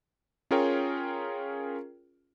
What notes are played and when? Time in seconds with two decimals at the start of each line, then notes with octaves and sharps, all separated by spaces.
0.51 C#4 F4 G#4 A#4 C#5 G5